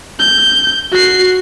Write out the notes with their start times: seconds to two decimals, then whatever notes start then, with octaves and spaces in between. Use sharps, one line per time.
0.20 G6
0.92 F#4 C7